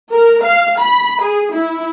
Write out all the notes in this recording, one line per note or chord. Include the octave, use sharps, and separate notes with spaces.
A#4
F5
B5
G#4
E4